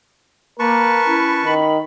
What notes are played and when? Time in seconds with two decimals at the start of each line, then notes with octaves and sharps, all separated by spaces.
0.60 A#3 A#4 B4 A5 C#6
1.07 C#4 E4
1.45 D#3 B5